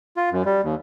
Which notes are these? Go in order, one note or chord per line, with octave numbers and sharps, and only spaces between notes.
F4
F#2
G3
D#2